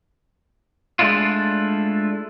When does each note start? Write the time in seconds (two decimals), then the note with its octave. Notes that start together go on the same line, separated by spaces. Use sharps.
0.99 G#3 A3 D4 E4 F4